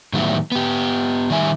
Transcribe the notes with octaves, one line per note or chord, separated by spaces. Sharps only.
A2 D#3 F#3 G3 B3 E4
B3 G4
D#3 G3 E5 G#5